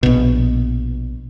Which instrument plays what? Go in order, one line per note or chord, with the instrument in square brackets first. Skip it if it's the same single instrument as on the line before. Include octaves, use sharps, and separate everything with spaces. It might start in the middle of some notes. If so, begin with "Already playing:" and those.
[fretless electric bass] A#1 B2